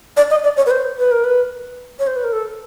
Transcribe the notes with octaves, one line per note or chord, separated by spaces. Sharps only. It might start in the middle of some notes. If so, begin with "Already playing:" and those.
D5
D#5
D5
C#5
B4
C5
B4
A#4
B4
C#5
C5
B4
A#4
A4